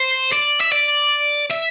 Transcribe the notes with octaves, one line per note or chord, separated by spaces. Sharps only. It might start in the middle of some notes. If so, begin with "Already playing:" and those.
Already playing: C5
D5
E5
D5
E5